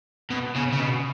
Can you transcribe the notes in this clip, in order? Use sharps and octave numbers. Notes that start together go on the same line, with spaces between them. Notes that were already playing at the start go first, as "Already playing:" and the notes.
B2
C#3
C#3
B2